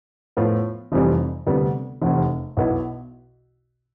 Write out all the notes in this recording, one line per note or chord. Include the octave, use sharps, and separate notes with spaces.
A2 F3 B3 F4
F1 F2 C3 E3 G3
D2 C3 G3 B3
F1 E2 C3
B1 B2 B3 E4